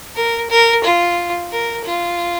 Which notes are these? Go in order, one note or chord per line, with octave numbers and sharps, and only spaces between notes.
A#4
A#4
F4
A#4
F4